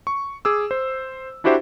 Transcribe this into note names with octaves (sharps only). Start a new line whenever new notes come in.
C#6
G#4 D6 E6
C5
D4 E4 F#4 G4 C5 E5